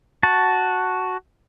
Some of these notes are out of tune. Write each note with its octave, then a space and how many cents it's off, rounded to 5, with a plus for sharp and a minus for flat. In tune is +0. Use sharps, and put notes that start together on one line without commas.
F#4 +0 A5 +0